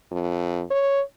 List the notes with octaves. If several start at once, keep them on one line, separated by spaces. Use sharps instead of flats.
F2
C#5